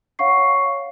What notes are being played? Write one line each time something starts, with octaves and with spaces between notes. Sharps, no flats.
C#5 F5 F#5 C#6 C7